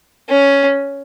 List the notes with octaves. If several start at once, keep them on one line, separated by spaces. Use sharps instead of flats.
C#4